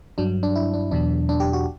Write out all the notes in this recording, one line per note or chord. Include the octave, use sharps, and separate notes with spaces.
G2 F#3 D4
D4
E4
D4
E2 B2 F#3 D4
D4
G4
F#4